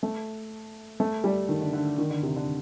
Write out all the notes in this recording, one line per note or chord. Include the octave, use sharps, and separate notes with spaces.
A3
A3
G3
D#3
D3
D3
D#3
D3
C3
D3